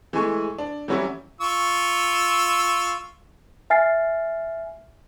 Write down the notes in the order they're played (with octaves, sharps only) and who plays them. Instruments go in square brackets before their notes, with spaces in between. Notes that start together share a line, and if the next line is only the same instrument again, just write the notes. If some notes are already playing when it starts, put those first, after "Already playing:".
[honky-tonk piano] E3 G#3 A3 G#5 C#6
D4
E3 F#3 G3 C#4 E4
[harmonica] F4 C#6 E6
[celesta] E5 G#5 F6 A6 C7